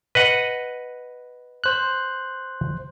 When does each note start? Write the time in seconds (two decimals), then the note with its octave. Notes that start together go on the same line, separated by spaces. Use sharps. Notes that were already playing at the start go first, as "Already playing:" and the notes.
0.15 B4 D#5 F#5
1.64 C5 F#6